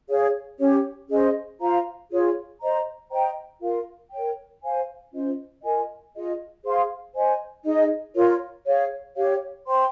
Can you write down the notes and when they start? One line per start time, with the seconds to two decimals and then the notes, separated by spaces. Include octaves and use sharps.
0.09 G#4 C#5 F5
0.59 C#4 G4 C#5
1.09 C#4 G#4 C5 D#5
1.60 F4 C5 F5 A#5
2.11 F4 G#4 C#5
2.61 C5 D#5 A#5
3.11 C5 D#5 G5 A#5
3.62 F4 A#4 F5
4.12 A#4 C#5 G5
4.63 C5 F5 G#5
5.13 C#4 F4 C5 D#5
5.63 F4 A#4 D#5 G#5
6.14 F4 G#4 D#5
6.64 G#4 C5 F5 C6
7.14 C5 D#5 G#5
7.65 D#4 G#4 D#5
8.15 F4 A#4 C#5
8.66 G#4 C#5 F5
9.17 G4 C#5 F5
9.67 C5 G5 C6